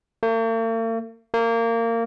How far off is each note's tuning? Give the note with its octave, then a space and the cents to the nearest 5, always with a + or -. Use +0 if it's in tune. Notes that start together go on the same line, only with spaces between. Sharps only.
A#3 -45
A#3 -20